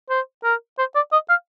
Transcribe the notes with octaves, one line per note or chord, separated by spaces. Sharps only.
C5
A#4
C5
D5
D#5
F5